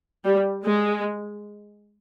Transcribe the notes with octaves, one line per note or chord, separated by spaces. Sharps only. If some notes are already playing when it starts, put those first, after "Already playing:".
G3
G#3